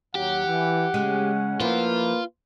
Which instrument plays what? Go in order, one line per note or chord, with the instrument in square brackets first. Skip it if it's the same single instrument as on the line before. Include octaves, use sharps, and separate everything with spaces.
[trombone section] D#2 F#3 [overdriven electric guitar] G4 [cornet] F#5
[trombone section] E3
[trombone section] C#3 C#4 [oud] G#3
[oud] F3 C#4 E4 [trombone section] A#3 B4 [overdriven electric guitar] F4